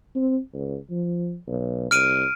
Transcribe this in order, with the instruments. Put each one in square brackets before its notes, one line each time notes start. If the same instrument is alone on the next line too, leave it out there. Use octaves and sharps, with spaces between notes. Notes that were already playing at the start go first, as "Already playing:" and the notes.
[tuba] C4
C#2
F3
B1
[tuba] C2 [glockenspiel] F6 D7 D#7